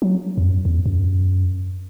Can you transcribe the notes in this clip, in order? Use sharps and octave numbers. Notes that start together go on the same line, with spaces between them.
F#3
E2
F#2
E2
F#2